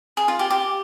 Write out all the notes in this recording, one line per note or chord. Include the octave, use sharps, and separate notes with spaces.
G#4
F4
G4
G4